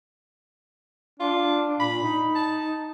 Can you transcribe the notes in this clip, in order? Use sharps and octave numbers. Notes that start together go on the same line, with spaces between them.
D4 F4
A#2 B5
D#4
A5